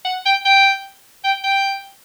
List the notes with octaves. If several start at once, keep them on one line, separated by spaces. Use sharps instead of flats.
F#5
G5
G5
G5
G5